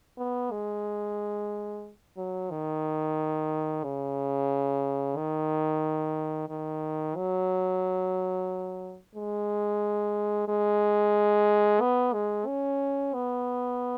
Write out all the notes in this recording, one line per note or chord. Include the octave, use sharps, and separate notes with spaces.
B3
G#3
F#3
D#3
C#3
D#3
D#3
F#3
G#3
G#3
B3
G#3
C#4
B3